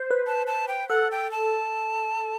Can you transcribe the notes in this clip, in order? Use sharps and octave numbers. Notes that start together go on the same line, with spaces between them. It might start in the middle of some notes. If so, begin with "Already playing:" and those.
Already playing: C5
B4
A5
A5
G5
A4 F#5
G5
A5